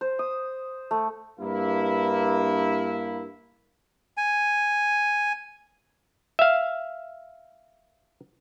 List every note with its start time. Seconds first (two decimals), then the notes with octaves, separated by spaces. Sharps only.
0.01 C5
0.19 D#6
0.91 A3
1.40 G2 A#3 E4
4.17 G#5
6.39 E5 F5